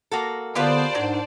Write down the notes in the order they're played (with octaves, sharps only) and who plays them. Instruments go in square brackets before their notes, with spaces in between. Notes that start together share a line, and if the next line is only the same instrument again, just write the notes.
[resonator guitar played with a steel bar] A#3 F#4 A4
[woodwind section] D3 B3 [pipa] F4 G4 B4 [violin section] C5 D5 A5
[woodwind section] G#2 D4 [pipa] F#3